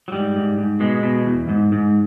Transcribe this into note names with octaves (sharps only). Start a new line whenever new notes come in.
F#3
G#2 G3
G#2
G#2
B2 G#3
B2
E2
G#2
G#2